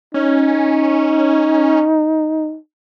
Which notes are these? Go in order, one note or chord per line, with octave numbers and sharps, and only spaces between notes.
C#4 D#4